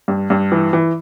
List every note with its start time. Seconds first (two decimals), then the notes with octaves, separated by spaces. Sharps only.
0.08 G2
0.30 G2
0.52 E3
0.73 E3